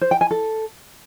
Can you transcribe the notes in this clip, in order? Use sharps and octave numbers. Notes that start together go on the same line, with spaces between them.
C5
G5
G#5
A4